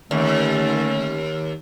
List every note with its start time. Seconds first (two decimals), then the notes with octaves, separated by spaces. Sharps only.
0.11 D#2 D3 A3 C#4